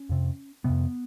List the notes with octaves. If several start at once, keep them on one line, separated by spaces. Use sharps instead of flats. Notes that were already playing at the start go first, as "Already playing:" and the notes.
Already playing: C#4
F2 C3
F2 C3 B3